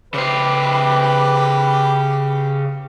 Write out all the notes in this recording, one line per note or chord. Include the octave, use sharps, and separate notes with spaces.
C#3 G4 B4 C5 B5 D6